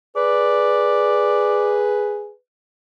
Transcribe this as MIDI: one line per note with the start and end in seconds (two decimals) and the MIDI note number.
0.16 2.32 68
0.16 2.38 71
0.16 1.81 74